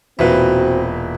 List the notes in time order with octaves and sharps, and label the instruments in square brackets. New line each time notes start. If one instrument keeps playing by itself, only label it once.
[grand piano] E1 B4 [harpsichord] A#2 E3 [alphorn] C4 [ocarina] F#4